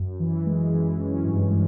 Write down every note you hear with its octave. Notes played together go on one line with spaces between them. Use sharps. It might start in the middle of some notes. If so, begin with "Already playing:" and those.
Already playing: F#2
E3
G#3
E3
C#4
G2
G#3